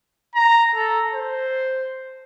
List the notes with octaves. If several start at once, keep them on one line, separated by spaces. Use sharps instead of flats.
A#5
A4
C5